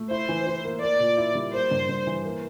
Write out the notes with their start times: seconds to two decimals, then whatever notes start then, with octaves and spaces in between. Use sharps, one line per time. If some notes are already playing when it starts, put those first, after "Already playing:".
Already playing: A3
0.11 E4 C5
0.29 E3
0.46 E3
0.64 A#3
0.82 A#3 D5
1.00 A#2
1.17 E4
1.35 G3
1.53 A#3 C5
1.71 G2
1.89 G2
2.07 E3
2.24 A#3